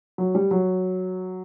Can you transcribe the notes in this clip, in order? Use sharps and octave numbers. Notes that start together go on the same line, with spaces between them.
F#3
G3
F#3